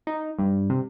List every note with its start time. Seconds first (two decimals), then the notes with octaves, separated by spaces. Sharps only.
0.07 D#4
0.39 G2
0.70 C3